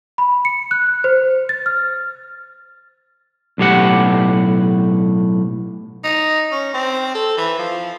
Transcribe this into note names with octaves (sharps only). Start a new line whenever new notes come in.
B5
C#7
F#6
C5
A6
F6
B1 A2 G4 F#5
D#4
C#4
C4
A4
E3
F3